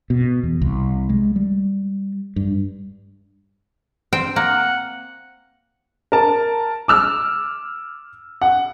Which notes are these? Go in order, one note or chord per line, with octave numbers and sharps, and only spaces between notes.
B2
E2
C2
G#3
G3
G2
C4 C5 G5
A#3 F#5
A#4 A5
D6 E6 F6
F#5